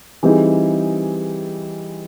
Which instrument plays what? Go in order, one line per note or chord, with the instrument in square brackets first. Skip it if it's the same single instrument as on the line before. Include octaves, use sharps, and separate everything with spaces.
[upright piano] E3 G3 C4 D#4 G#4